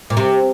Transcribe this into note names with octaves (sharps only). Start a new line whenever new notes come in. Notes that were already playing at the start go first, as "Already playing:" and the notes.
A#2
C3